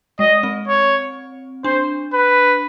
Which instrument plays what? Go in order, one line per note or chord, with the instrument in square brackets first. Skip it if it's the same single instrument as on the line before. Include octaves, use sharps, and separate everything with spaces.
[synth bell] G#3 [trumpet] D#5
[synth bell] C4
[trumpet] C#5
[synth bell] D4 [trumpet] C5
[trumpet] B4